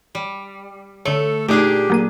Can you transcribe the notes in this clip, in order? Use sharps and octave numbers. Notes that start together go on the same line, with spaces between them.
G3
D3 A3 A4 C#5
A#2 A3 D4 D#4 G4 G#4
F#3 A#3 D#7